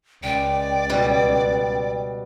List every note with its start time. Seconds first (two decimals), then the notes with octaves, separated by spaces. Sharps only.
0.23 C#2 D5 G5
0.90 B2 G3